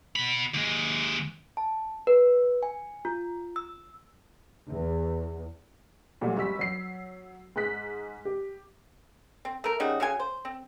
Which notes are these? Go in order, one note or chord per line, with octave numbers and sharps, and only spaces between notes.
B2 B5
D#2 G#3
A5
B4
G#5
F4
E6
E2
A#2 F#3 G3 A3 F#4
G#1 G3 E6 B6
F#3 C7
G#2 G#4 F#6 B6
G4
C4
A3 A#4
C#3 G3 D#4 F#4
C#3 F#4 F5 G#5
C5
C4